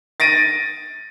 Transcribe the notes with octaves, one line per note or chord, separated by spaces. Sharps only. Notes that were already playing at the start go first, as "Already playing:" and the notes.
A6 A#6 D7 D#7